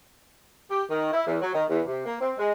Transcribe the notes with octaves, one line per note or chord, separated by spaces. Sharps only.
G4
D#3
E4
E2
F#3
D#3
E2
C3
A#3
C4
G#3